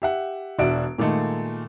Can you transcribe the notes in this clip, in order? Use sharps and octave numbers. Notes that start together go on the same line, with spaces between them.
G4 E5 F#5
E1 D4 F#4 E5 D7
A#2 D#3 G#3 A3 A4